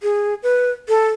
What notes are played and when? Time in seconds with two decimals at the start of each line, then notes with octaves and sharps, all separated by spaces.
0.03 G#4
0.43 B4
0.89 A4